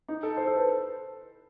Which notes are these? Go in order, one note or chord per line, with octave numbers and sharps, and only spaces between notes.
D#4
A4
C5
A4
B4